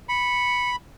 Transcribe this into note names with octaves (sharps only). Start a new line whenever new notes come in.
B5 C#7